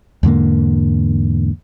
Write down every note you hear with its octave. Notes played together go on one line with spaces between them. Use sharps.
E2 G#2 D3 A#3